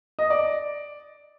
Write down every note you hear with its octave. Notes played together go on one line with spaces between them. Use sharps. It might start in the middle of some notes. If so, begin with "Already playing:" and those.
D#5
D5